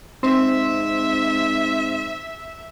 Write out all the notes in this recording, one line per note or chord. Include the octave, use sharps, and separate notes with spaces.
G#2 C4 E5